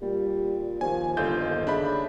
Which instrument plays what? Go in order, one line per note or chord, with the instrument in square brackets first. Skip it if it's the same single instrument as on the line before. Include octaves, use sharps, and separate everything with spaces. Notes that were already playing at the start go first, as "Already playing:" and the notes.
[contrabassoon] A#2 [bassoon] G3
[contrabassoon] D#2 [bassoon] F3 [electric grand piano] G#5
[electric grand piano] G1 F4 G6 [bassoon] D3 [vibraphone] D#5
[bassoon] C#3 [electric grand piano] D4 B5 [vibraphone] E5